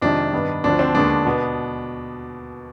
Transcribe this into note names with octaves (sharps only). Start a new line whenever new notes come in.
F2 C3 D#3 G#3 D4
G2 D#3 B3
D2 D3 F3 C4 D4
C4
D#2 D3 G#3 B3 D4
B2 B3